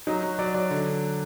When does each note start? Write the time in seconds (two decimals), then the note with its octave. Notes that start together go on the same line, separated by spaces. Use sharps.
0.07 F#3 D#4
0.23 F#3
0.39 F#3 D5
0.54 F#3 D5
0.71 D3